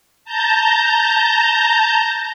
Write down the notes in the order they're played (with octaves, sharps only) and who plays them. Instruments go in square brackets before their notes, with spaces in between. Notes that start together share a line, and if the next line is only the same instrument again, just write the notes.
[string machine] A5 A#5 G6